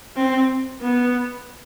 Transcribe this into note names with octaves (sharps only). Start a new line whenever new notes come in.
C4
B3